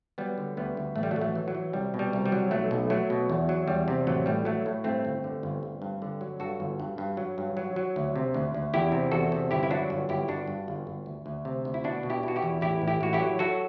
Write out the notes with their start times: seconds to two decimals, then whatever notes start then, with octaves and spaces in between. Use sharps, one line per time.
0.18 F#3 G3 B3
0.38 D3
0.57 D2 G3 B3
0.77 D2
0.96 A1 A3
1.03 G3
1.11 F#3 A3
1.16 A1
1.21 F#3 A3
1.35 E3
1.48 F#3
1.55 E3
1.73 C2 G3
1.94 B2
1.99 G3
2.13 C2
2.26 G3
2.32 F#3
2.51 B1 F#3 A3
2.71 B1
2.90 F#3 A3
3.10 B2
3.30 E2
3.49 F#3
3.68 E2 G3
3.88 C3
4.07 A1 F#3 A3
4.26 A2 G3
4.45 A2 F#3 A3
4.66 A2
4.84 G2 A3 C4
5.05 G1
5.24 D3
5.43 G1
5.63 G1
5.82 G2
6.02 D3
6.21 F#3
6.40 G2 F#4 A4
6.60 G1
6.80 G2
6.98 G2
7.17 F#3
7.38 G2
7.57 F#3
7.76 F#3
7.96 D2
8.16 C3
8.34 D2
8.54 D2
8.74 E2 E4 G4
8.92 C3
9.12 E2 F#4 A4
9.32 C3
9.51 G1 E4 G4
9.63 E4
9.71 F#3 D4 F#4
9.90 G1
10.09 G1 E4 G4
10.28 G1 D4 F#4
10.48 G2
10.68 G1
10.87 G1
11.06 D2
11.26 D2
11.45 C3
11.65 D2
11.74 E4
11.84 B2 D4 F#4
12.03 B2
12.10 E4 G4
12.23 B2 F#4
12.36 E4 G4
12.43 E2
12.61 A1 E4 G4
12.82 A1
12.87 E4 G4
13.01 A1 F#4
13.13 E4 G4
13.20 F#3
13.39 F#3 F#4 A4